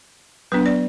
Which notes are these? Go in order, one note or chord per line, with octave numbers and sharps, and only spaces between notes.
F#3 B3 D4 B4
D5